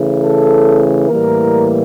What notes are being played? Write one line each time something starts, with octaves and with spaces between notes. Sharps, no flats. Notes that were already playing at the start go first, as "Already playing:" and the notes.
Already playing: C#3 E3 A3
A4
A2 E3 G3 A#3 A#4